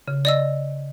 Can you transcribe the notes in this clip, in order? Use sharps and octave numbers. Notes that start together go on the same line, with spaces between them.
C#3
D5 D#5 E6